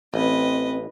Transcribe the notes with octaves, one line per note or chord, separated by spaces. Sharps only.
A1 C4 B4 D#5